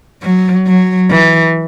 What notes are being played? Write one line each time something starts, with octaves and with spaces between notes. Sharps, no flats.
F#3
F#3
E3